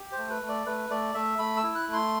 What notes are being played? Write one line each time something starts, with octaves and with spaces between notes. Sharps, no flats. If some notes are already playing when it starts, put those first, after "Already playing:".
Already playing: G4
C5
A3
B4
A3
D5
A3 B4
A3 D5
A3 E5
A3 B5
E6
E4
F#6
A3
C6